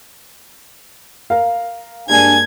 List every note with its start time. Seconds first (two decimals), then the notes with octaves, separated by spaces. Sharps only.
1.30 A#4 F5
2.09 G2 G#3 A#3 D4 G#5 G#6